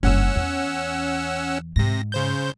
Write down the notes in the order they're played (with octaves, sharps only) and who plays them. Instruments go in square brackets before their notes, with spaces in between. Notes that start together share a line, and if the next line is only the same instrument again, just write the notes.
[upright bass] F#1 G2 [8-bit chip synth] C#4 F#5 E6
[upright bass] E2
[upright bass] G#2 [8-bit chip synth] C3 A#6
[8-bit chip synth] C#3 C5 G6